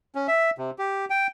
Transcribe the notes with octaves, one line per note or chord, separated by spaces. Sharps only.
C#4
E5
C3
G4
G5